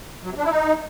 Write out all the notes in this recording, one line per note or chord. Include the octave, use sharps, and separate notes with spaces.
F#3
C3
D4
E4
D#4